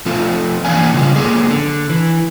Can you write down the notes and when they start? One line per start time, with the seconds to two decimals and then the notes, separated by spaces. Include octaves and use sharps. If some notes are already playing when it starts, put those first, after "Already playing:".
0.06 F3 A3 C4 F4
0.65 E3 A#3 D4 F5 G#5
0.94 C#3 G3 F4
1.16 F2 C#3 A#3 G4 G#4
1.51 D3
1.90 E3